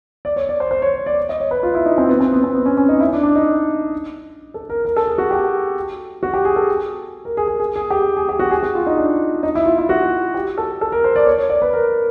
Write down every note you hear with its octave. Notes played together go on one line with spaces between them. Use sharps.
D5
C#5
D5
C5
C5
C#5
D5
D#5
C#5
B4
F4
E4
D#4
C4
B3
C4
B3
C4
B3
C#4
C#4
D#4
E4
D4
D4
D#4
A4
A#4
A#4
A4
G#4
F#4
G4
F#4
G4
G#4
A4
A#4
G#4
G#4
G#4
G#4
G4
G#4
G#4
G4
F#4
G#4
F#4
F4
D#4
D4
D#4
E4
F4
E4
F#4
G4
A4
A4
A#4
C5
D5
C#5
C#5
D5
B4
A#4